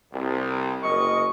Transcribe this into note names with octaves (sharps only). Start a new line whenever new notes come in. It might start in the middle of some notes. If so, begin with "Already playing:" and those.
C2
F#1 A#4 D#5 C#6